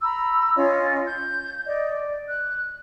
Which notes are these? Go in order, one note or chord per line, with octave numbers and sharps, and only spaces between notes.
A#5 B5 E6
C#4 F4 C#5 D#5
G6
D5 D#5
D5
F#6